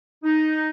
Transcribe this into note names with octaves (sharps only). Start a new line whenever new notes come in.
D#4